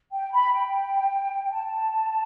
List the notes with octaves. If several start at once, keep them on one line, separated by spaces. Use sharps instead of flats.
G5
B5
G5
G5
A5